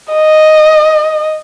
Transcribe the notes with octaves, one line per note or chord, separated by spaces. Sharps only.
D#5